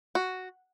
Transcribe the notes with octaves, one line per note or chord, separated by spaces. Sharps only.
F#4